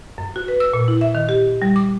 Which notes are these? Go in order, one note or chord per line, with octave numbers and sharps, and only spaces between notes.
F#2
F#4
B4
E6
A#2
E4
E5
D#3
G4
G3
D6